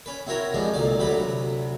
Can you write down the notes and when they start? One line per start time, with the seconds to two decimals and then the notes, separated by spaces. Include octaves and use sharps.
0.06 C#4 B4
0.27 C4 E4 F#4 A#4 C#5
0.54 C3 F3 G#3 C4 D4
0.74 B1 A#2 D3 D5
0.99 D2 C3 F#3 B4 B5